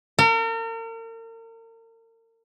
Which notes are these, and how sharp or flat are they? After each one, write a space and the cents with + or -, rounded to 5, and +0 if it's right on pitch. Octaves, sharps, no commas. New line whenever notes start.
A#4 -40